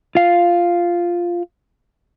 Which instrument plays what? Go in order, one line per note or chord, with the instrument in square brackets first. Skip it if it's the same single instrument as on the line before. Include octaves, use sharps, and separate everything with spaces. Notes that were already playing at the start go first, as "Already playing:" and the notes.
[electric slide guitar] F4 F5